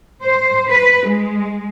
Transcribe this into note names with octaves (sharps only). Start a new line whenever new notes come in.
C5
B4
G#3